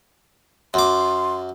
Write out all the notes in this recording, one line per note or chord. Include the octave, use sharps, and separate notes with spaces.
F#2 C6 D6